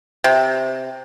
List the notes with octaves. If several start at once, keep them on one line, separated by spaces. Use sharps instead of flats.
C3